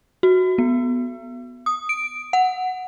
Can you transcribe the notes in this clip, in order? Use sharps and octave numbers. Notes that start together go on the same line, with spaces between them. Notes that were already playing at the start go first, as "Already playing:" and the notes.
F#4
B3
D#6
D7
F#5